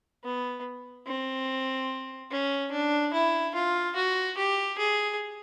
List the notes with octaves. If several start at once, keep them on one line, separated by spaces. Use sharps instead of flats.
B3
C4
C#4
D4
E4
F4
F#4
G4
G#4